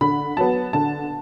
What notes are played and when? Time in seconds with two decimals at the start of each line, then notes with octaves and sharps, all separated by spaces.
0.01 D3 B5
0.37 F#3 B3 A5
0.73 D3 A5